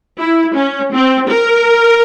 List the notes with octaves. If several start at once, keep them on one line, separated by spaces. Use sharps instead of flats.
E4
C#4
C4
A#4